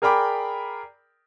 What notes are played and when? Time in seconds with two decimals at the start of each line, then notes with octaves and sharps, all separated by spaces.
0.02 G#4 A#4 D5 G5 B5 D6